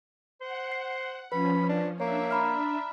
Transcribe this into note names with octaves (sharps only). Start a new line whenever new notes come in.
C5 F#5
C7
F3 C#4 B4 B5
D4
A#3 D4 C#5 E5
A#5 B5 F6